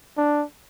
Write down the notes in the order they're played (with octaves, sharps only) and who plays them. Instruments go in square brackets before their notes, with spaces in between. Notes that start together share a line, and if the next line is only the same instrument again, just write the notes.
[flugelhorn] D4